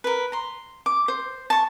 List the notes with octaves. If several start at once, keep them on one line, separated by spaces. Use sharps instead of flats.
A#4 B4
A#5 C6
D6
C5
A5 C#6